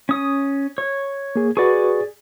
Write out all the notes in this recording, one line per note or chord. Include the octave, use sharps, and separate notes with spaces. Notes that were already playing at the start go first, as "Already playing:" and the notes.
C#4 D#6
C#5
A#3 G#4
F#4 G#4 B4 D5 C#6